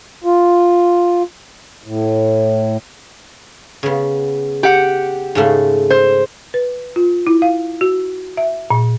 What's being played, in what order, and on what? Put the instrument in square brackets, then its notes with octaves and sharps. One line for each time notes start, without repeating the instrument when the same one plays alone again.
[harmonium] F4
A2
[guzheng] C#3 B3
[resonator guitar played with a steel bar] G4 F#5
[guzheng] G#2 C#3 A3
[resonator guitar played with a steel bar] C5
[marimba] B4
F4
E4
F5
F#4
E5
A#2